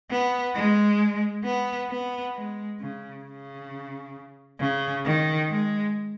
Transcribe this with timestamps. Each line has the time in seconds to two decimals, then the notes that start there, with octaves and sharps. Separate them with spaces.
0.10 B3
0.55 G#3
1.44 B3
1.90 B3
2.34 G#3
2.80 C#3
3.24 C#3
4.60 C#3
5.04 D#3
5.49 G#3